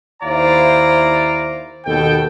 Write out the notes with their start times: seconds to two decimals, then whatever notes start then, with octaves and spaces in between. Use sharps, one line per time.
0.23 D#2 E4 C5 D5 F5 A#5
1.85 D#2 B2 A4 G5